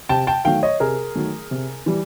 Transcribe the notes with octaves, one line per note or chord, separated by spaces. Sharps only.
C3 G5 A5
G5 A5
D#3 F#3 A3 F5 G5
C#5 D#5
C3 G#4 A#4
D#3 F#3 A3
C3
E3 G3